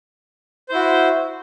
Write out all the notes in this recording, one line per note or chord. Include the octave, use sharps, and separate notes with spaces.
E4 F#4 C5